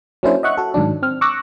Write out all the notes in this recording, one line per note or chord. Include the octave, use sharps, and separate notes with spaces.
F#3 A#3 C#4 D4 E4 C5
D#5 E5 F#5 C#6 F#6
F#4 A4
G#2 D#3 F#3 D4
C4 F6
C#6 D6 E6 F#6 A#6